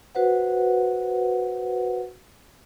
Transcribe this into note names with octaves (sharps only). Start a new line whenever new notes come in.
F#4 B4 C5 F#5